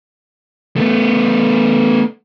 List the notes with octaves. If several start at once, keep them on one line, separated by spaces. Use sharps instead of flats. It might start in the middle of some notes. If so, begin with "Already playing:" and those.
A3 B3